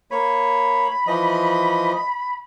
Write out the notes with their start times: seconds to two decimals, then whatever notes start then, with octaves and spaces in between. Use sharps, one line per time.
0.11 A#3 C#5 B5
1.07 E3 F3 D#5